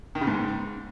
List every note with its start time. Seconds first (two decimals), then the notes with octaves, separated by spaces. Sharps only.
0.15 D#3
0.21 C#3
0.27 G#2